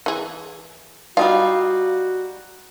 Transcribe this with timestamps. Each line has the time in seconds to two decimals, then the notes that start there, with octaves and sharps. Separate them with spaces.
0.06 E3 G#4
1.17 G3 D#4 F4 F#4 F5